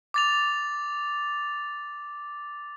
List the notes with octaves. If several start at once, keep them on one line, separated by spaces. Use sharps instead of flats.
D6 A6 F7